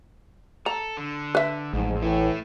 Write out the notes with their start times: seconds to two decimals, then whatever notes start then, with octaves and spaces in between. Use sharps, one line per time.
0.66 A4 A#5
0.97 D3
1.35 B4 E5
1.73 A1 F2 G#2
2.02 A2 E3 A3 E4